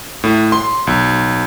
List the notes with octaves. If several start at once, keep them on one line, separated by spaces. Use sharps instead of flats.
A2
C6
B1